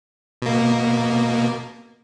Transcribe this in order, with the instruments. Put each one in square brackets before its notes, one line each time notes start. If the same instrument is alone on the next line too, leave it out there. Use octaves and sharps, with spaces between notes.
[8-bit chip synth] B2 A#3